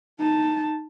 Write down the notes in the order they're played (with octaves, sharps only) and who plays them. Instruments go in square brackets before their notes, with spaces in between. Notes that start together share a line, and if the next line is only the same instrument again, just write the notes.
[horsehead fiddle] D#4 A5